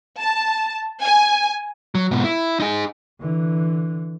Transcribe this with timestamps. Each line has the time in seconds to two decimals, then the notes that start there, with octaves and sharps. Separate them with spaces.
0.18 A5
1.03 G#5
1.95 F#3
2.11 G#2 B2
2.24 E4
2.60 D#4 G#4
3.21 D3 E3